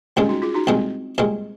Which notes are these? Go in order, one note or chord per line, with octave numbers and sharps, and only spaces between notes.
C2 A#2 G#3 C#4 F4
D#4 F#4
F4 G#4
D#4 F#4
C2 A#2 G#3 C4
C2 A#2 G#3